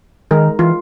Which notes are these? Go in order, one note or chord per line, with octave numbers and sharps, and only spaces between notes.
D#3 G#3 D#4 A#4
E3 F4